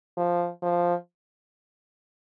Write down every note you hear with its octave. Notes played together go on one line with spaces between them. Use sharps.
F3
F3